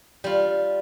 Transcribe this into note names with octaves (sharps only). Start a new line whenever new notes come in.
G3 F4